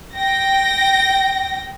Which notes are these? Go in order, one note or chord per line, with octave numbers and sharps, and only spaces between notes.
G5 A#6